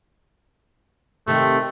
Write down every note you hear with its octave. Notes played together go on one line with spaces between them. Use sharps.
C3 D#3 A3